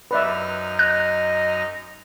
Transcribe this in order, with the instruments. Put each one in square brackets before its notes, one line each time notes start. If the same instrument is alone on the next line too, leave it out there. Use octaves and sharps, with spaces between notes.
[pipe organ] F#2 D#4 F6 [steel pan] B4 D5 E5
[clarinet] D#5 [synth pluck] F#6